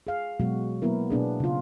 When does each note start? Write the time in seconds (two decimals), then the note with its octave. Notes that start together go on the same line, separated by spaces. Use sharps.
0.07 G#4 F5
0.40 B2 F#3 G#3 F#4
0.82 F#3 A#3 B3 E4 A#4
1.10 B2 B3 D4 G#4
1.40 C#3 F4